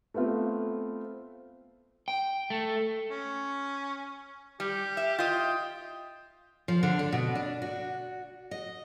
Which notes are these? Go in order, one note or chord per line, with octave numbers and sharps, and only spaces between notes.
A3 B3 C4 F4
G5
A3
C#4
G3 G4
E5
F4 D#5 G5
F3
D3
D4
B2
D4
F#4
D#5